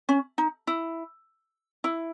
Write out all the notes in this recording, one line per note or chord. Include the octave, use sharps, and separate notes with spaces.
C#4
D#4
E4
E4